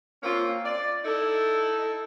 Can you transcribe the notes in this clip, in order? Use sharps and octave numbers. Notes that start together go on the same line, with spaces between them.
A#3 C4 C#4 F4
D5
D#4 E4 A4